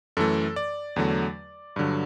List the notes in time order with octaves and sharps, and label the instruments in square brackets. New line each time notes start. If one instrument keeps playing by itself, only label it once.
[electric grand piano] F#2 E3 A3 A4
D5
E2 D3 F#3 A3
G2 D3 F#3